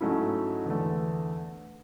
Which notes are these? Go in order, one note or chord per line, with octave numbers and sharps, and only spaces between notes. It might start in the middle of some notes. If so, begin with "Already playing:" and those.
G#2 F#3 A3 C#4 E4
E2 D3 A3